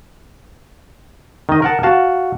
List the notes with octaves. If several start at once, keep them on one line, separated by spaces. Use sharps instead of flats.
D#3 D#5
A#4 F#5 A5
F#4 F5 A5